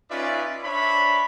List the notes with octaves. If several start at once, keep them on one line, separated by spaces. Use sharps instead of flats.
C#4 D#4 F4 B4 D5 E5
D4 C5 C#5 E5 B5